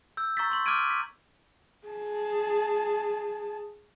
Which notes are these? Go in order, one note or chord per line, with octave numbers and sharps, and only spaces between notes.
E6 G6
A#5 C#6 E6 G6 A6 B6
C6 C#6 F#7
D6 F6 G6 G#6 D7 D#7
B6
G#4 A5